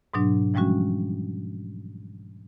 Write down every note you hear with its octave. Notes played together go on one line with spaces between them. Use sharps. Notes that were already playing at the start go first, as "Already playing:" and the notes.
G#2 B2 F#3 D4
E3 F3 G3 G#3 C#4 F#4